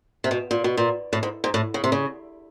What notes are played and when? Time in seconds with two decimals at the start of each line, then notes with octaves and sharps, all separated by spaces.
0.24 C3
0.31 B2
0.51 A#2
0.64 B2
0.77 A#2
1.13 A2
1.23 G#2
1.44 G#2
1.54 A2
1.74 C#3
1.84 C3
1.92 C#3